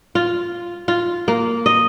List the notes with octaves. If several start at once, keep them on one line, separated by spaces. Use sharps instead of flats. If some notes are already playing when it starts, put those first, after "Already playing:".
F4
F4
A#3
D#5